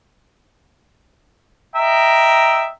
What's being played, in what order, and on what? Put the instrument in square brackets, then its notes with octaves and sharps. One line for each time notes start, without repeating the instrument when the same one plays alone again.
[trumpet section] D#5 E5 G5 A#5